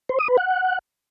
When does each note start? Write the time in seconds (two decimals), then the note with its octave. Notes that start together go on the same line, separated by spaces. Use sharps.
0.09 C5
0.19 D#6
0.28 B4
0.38 F#5